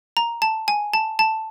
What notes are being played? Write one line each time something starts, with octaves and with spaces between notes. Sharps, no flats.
A#5
A5
G#5
A5
A5